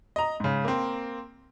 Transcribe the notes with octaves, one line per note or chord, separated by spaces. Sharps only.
D#5 A#5
G#2 C#3
A#3 C4